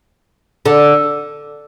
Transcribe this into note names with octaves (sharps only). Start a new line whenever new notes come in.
D3